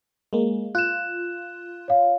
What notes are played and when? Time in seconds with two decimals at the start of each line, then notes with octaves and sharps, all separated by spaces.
0.33 G#3 A#3
0.75 F4 F#6 E7
1.88 C#5 F5